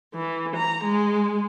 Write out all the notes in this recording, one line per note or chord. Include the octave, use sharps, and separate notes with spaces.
E3
A#5
G#3